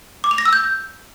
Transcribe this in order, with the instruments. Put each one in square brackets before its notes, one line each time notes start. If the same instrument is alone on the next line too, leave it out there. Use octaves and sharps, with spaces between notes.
[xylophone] D6
F7
A#6
E6
G6